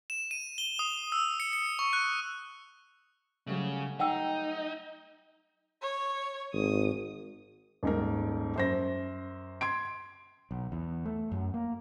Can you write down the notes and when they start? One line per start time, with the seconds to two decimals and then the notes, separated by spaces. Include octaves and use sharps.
0.10 E7
0.31 D#7
0.58 G7
0.79 D#6
1.12 E6
1.40 C#7
1.53 C#7
1.79 C#6
1.93 F#6
3.47 C#3 F#3 G3 A3
4.00 D#4 F#5 G5 E6
5.82 C#5
6.53 G#1 D#6
7.83 D#1 G#2 A#4
8.56 F#2 C5 A#6
9.61 C6 G#6 D7
10.51 B1
10.72 E2
11.06 A3
11.32 F#2
11.54 A#3